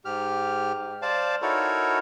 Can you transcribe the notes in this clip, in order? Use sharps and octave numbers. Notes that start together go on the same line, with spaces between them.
G#2 G4 F6
C5 D5 F5 A5
D#4 E4 F#4 A4 A#4 C#5